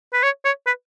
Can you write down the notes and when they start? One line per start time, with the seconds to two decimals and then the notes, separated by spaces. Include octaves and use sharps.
0.13 B4
0.23 C#5
0.45 C#5
0.67 B4